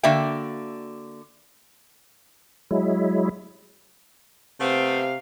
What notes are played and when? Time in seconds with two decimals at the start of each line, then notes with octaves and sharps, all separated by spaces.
0.03 D3 A#3 F#4 D5 E5 G5
2.71 F#3 G#3 E4
4.60 C3 A3 B3 C4 F5